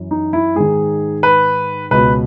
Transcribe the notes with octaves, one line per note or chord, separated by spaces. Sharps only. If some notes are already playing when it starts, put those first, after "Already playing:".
Already playing: F#2 E3
D#4
E4
G#2 D#3 G#4
B4
C#2 B2 B4